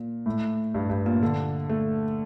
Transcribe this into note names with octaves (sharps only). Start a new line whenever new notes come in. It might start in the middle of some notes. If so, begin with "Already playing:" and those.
Already playing: A#2
A2
G2
G2
A#2
D3
A3